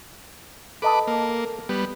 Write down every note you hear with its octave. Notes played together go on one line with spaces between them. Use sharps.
A4 B4 D#5 A5 D6
A#3
G3 B3